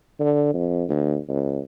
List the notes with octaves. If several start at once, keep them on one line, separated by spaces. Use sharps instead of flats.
D3
F2
D2
C#2